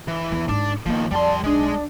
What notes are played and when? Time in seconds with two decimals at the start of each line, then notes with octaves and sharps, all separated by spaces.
0.08 E3
0.32 E2
0.49 G#2 G#3 D4
0.86 D#3 F3 A#3 B3
1.11 F2 G3 D5 A5 C6
1.44 B1 G#3 D4 G#4